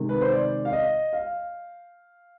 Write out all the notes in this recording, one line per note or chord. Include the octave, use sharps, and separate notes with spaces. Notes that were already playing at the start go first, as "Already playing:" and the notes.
Already playing: C3 D#3 G#3
B4
C5
D5
F5
D#5
F5